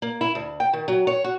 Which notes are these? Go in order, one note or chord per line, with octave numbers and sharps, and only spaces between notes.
A#3
E4
D2
G5
D#3
F#3
C#5
F#4